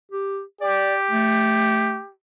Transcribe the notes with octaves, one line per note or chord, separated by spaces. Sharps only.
G4
G4 D5
A3